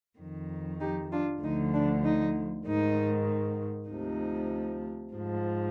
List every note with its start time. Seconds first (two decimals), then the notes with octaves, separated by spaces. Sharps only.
0.19 F2 D#3
0.80 D#4 G4
1.11 D4 F4
1.42 D2 D3 F3 D#4
1.73 D4
2.04 D#4
2.66 G#2 D#3 D#4
3.90 D2 C3 F3 D#4
5.14 G#2 F3